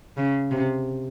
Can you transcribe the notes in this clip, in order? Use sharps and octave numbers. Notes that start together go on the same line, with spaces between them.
C#3
C3